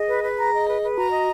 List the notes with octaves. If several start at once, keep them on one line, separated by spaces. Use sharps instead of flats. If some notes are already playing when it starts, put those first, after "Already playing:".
Already playing: G#4 D#5
B4
B4
A#5
D#5
B4
B4
F#4 A#5
D#5